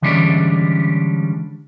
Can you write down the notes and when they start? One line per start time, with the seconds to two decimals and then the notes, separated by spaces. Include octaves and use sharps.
0.02 D3 E3 G3 G#3 C#4 D4